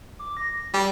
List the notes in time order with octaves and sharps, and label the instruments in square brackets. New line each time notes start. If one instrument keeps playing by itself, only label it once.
[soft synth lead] D6
A#6
[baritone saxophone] G3 [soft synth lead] G5